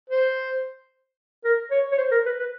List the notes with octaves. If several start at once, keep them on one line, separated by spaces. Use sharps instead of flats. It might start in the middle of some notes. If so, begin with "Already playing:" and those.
C5
A#4
C#5
C#5
C5
A#4
B4
B4